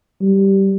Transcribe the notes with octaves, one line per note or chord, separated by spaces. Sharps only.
G3